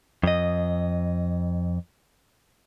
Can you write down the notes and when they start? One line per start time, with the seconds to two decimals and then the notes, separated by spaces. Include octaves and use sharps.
0.23 F2 D#5